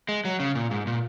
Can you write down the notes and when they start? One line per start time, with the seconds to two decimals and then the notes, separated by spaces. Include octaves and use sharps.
0.09 G#3
0.25 F#3
0.40 C#3
0.55 A#2
0.71 G#2
0.87 A#2